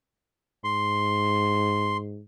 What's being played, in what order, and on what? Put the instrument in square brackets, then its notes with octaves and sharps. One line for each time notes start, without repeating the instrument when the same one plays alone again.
[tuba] G#2 [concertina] C6